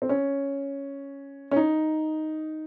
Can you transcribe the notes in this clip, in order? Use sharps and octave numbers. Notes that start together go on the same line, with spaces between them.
C4
C#4
C#4
D#4